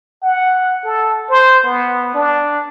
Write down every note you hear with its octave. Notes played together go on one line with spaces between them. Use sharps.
F#5
A4
C5
B3
D4